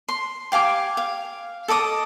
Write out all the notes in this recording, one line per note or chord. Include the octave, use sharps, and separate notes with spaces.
C6
G4 F5 G#5 D6
F5
A4 D#5 D6 D#6